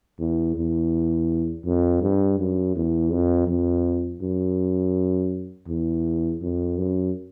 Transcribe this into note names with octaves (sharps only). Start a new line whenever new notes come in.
E2
E2
F2
G2
F#2
E2
F2
F2
F#2
E2
F2
F#2